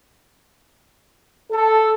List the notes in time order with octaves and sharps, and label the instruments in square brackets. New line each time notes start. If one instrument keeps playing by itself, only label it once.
[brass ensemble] A4